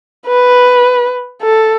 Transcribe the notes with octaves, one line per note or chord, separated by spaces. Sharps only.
B4
A4